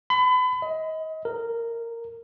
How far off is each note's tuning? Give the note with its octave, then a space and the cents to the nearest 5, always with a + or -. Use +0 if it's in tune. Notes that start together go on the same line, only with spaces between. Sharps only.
B5 +35
D#5 +30
A#4 -10